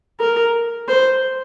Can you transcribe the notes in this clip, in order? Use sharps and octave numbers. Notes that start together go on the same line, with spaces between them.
A#4
C5